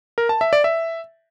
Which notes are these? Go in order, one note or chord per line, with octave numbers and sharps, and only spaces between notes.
A#4
A5
E5
D5
E5